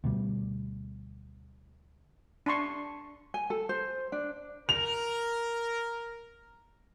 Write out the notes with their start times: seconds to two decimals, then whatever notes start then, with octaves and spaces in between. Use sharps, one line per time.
0.04 D2 B2 G3
2.46 D4 A5 C6 C#6
3.34 G#5
3.50 A4
3.69 C5
4.12 D4
4.69 A#4 F7